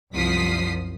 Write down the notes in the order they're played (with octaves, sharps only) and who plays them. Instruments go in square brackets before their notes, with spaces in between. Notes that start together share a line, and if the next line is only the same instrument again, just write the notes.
[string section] C2 F#2 F3 D#6 B6 C7